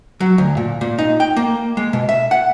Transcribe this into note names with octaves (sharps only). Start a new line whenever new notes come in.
F#3
D2
A#2
A#2
D#4
G5
A#3
G#3
B2
E5
F#5